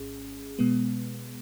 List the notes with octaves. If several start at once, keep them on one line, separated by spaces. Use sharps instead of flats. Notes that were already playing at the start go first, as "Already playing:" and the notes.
Already playing: G#1 G#2 C#4 G#4
B2 G#3 B3